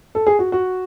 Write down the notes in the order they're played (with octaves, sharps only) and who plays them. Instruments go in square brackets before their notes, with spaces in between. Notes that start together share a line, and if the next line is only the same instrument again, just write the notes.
[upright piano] A4
G#4
F#4
F#4